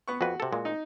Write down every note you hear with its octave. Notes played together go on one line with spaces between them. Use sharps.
B3 C#6
F2 F#4 B4
C3 A4
A#2 G#3
D#4